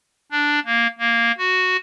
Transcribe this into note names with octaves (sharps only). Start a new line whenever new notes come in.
D4
A#3
A#3
F#4